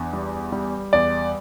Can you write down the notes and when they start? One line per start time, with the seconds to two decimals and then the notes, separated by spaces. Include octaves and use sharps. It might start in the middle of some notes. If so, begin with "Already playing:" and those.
Already playing: E2 D4
0.13 G3
0.52 G3
0.93 E2 D5